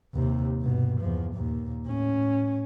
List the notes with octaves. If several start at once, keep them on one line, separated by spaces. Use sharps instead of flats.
D#2 C3
G2 B2
E2 F3
D#2 A#2
A2 C#4